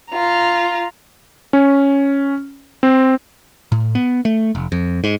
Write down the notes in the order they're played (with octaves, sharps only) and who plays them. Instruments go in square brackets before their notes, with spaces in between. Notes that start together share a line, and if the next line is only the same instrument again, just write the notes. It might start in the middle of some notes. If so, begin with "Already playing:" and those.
[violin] F4 A#5
[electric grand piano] C#4
C4
[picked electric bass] A2
B3
A3
F1
F2
G#2